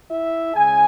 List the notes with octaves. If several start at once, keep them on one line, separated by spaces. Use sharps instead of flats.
E4 E5
C#3 G#3 C#4 G#4 G#5